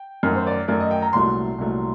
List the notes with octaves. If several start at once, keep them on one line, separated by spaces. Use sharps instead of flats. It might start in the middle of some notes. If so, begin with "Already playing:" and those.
Already playing: G5
F#2 D#3 A3
C5
D5
F#2 D#3 A3 D5
D#5
G5
A#5
C2 A#2 F#3 A3 C6
C2 A#2 F#3 A3